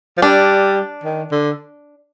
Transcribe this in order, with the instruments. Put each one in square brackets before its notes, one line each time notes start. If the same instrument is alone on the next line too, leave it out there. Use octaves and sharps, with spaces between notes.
[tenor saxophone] F3
[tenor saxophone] G3 [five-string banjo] D4
[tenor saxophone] D#3
D3